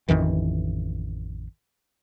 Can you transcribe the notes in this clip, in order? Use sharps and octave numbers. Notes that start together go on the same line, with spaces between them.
A1 F2 D#3 E3